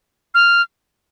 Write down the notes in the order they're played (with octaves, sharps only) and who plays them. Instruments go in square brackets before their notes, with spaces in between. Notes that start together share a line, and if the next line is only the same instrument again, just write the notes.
[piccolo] F6